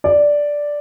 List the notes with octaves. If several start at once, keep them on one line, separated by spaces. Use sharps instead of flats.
D5